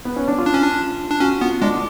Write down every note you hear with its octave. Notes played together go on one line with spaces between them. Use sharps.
B3
C#4
D4
F4
D4
C#4
D4
D4
C#4 F#4
B3 F4
G#3 D4